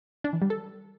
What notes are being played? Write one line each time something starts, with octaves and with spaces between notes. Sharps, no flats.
D4
E3
G3
A4